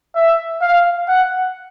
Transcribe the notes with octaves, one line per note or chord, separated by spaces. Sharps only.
E5
F5
F#5